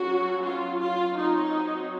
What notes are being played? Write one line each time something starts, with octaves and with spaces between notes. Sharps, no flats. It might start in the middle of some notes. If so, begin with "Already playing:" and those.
Already playing: F#3 C#4 F#4
F4
F4
F#3 C4 D#4